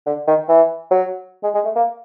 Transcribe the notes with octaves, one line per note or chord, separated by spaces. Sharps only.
D3
D#3
E3
F#3
G#3
G#3
A3
A#3